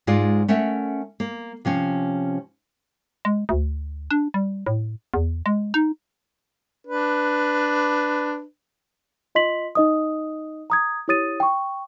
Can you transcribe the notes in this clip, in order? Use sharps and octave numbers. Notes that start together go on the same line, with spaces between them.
G#2 G#3 F4 D5
A3 C#4 A#4 E5 F#5
A#3
C3 F3 C#4
G#3
D2
D4
G3
A2
E2
G#3
D#4
D4 B4
F4 D#5 C6 B6 F#7
D#4 D#5 D#6
A#5 D#6 G#6
E4 G4 C#5 D#6 A6 D#7
G5 C#6